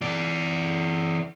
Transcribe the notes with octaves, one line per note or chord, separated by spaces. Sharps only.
E3 D5